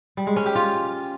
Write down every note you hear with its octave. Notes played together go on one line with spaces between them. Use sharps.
G3
G#3
C#4
G4
F4